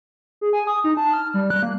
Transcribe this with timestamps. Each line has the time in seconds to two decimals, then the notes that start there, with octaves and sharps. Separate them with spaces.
0.41 G#4
0.53 G#5
0.67 D#6
0.84 D#4
0.97 A5
1.14 F6
1.34 G3
1.50 F#6
1.63 A#3